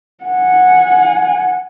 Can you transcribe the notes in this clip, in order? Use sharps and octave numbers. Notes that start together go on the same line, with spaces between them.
F#5 G#5